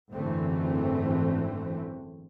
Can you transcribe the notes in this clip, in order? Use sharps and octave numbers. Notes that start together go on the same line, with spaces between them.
G#1 F#2 D3 E3 A3 C4